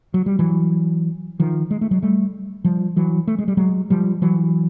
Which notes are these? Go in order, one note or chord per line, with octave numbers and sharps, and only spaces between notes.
F#3
G3
E3 F#3
D#3 F3
G#3
A3
F#3 G#3
G3 A3
F3 G3
E3 F#3
A3
G#3
G3
F#3 G#3
F3 G3
E3 F#3